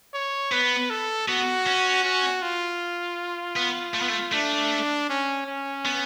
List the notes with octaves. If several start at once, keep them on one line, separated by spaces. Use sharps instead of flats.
C#5
B3 B4
A4
B3 F#4
C#4
F#4
F4
B3
A3
B3
A3
A3 D4
C#4
C#4
B3